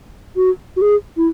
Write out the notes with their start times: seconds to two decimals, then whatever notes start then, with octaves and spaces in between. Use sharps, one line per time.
0.36 F#4
0.76 F#4
0.82 G#4
1.17 E4